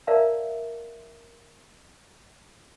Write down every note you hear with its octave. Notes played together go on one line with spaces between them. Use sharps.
A#4 D5 E5 F5 A5 A#5